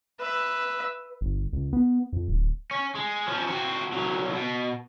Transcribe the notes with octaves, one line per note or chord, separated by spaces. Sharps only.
B4 E5
G1
C#2
B3
F2
D1
C#4
G#3
F3 C#4
C4 F#4
C2 F#3
B2